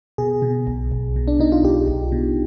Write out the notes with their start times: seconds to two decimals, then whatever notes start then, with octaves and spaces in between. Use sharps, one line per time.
0.18 B2 G#4
0.42 B2
0.67 B1
0.92 B1
1.16 B2
1.27 D4
1.39 B2 D#4
1.52 F4
1.63 B1 G4
1.88 B1
2.12 B2